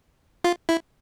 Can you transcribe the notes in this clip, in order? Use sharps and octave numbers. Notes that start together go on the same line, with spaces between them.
F4
E4